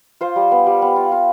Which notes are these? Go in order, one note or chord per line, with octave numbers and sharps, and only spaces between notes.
F4 C5
G3
B3
G3
B3
F4
F4